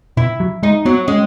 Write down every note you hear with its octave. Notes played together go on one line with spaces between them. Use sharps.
B2 E4
F#3
G#3 D#4
F#3 B3
G#3 C#4